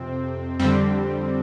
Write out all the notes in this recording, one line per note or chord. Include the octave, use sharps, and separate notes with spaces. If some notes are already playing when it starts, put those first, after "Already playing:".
Already playing: F2 C3 C4
F2 D3 G3 C4